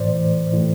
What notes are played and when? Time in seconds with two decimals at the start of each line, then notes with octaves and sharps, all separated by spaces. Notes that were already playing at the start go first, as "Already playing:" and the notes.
Already playing: A2 E3 C5 D5
0.14 A2 E3
0.52 A2 E3